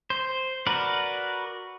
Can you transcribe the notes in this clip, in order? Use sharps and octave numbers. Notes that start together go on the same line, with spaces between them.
C5
F#4 A#4 B4 D5